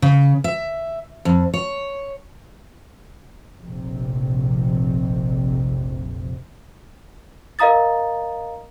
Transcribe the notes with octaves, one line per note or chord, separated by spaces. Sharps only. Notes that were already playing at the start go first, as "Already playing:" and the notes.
C#3
E5
F2
C#5
F1 A#1 F2 C3
A#4 D#5 F5 A#5 D#6 A6